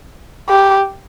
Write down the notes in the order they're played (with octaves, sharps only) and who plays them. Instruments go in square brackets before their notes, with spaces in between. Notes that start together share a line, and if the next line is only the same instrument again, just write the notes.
[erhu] G4